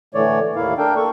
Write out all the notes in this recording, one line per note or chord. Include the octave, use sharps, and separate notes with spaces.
A2 D3 E3 A3 C#5 D5
D#2 A2 A#3 E4 F5
D4 A4 A#4 G5
A#3 A4 C#6